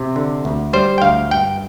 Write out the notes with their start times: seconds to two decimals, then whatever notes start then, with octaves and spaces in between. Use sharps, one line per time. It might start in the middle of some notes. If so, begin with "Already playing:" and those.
Already playing: C3
0.16 D3
0.45 D2
0.73 G3 C5
0.98 G5
1.02 D2 F5
1.31 G2 G5